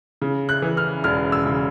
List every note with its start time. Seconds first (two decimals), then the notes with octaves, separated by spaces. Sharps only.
0.22 C#3
0.49 F#6
0.62 E3
0.77 F6
1.04 E1 F6
1.32 E6
1.46 C#3